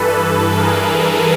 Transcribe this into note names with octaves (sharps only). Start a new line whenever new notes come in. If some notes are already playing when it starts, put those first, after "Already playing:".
Already playing: G2 E3 A4 B4
A4 B4
G#4 A#4